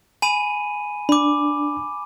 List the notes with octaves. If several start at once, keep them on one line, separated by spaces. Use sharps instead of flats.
G#5 B5 D#7
D4 B5 D6